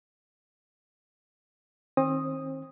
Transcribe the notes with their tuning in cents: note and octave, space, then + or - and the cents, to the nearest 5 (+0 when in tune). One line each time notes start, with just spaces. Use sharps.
D#3 +20 C4 +35 D#6 +0